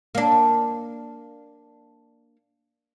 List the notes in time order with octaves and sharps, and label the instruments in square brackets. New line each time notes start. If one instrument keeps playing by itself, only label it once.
[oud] A#3 D4